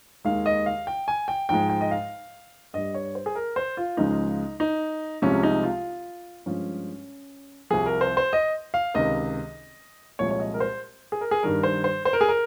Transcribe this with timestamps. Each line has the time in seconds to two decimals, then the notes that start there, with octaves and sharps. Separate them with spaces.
0.25 D#2 D#3 G#3 F5
0.46 D#5
0.66 F5
0.87 G5
1.08 G#5
1.28 G5
1.49 G#2 F3 G#3 G5
1.70 G5
1.81 D#5
1.91 F5
2.74 G2 G3 D#5
2.94 C#5
3.15 C5
3.26 G#4
3.35 A#4
3.56 C5
3.77 F4
3.97 C#2 C#3 F3 G#3 D#4
4.60 D#4
5.22 C2 C3 F3 G#3 C#4
5.43 D#4
5.63 F4
6.46 G2 F3 G#3 C#4
7.70 C2 C3 F3 G#4
7.86 A#4
8.01 C5
8.17 C5
8.33 D#5
8.74 F5
8.94 C#2 C3 D#3 D#5
10.19 C2 A#2 F3 G#3 C#5
10.31 C#5
10.40 D#5
10.54 A#4
10.60 C5
11.12 G#4
11.21 A#4
11.31 G#4
11.43 G2 D#3 G3 A#4
11.63 C5
11.84 C5
12.05 C5
12.13 A#4
12.21 G#4
12.29 A#4